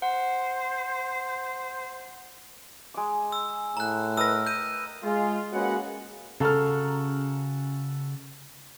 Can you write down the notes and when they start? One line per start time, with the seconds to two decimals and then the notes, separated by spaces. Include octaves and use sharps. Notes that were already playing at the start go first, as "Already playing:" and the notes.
0.02 C5 F#5
2.94 G#3 D6
3.32 E6
3.77 A2 A#5 F#6
4.17 A#4 B4 D#5 E6 A#6
4.46 G6 D#7
5.03 G#3 F4
5.53 G#3 A#3 C#4 F#4 B4 F#5
6.40 C#3 F#4 A4 A#5 F6